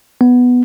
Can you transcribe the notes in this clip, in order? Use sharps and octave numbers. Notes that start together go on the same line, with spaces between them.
B3